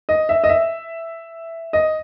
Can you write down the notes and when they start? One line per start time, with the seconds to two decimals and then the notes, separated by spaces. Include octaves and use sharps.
0.09 D#5
0.29 E5
0.44 D#5
0.49 E5
1.73 D#5